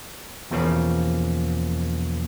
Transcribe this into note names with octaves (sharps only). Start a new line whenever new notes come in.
E2 B2 F3 A#3 C#4